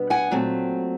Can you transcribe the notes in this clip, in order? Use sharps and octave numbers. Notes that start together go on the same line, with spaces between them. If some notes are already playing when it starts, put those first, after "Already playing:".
Already playing: B2 G3 B3 D4
F#5 G#5
A#2 F#3 A3 C4